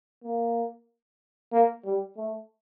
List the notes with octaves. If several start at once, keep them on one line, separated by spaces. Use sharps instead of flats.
A#3
A#3
G3
A3